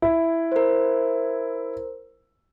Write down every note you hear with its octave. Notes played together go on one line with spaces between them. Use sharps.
E4
A#4 C5